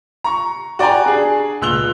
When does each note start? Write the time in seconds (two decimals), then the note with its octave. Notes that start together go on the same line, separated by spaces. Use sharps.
0.24 A#5 C#6
0.79 F#4 D5 G5 G#5 A#5
1.06 D4 G#4
1.61 C#2 A#2 E6 F#6 F7 G7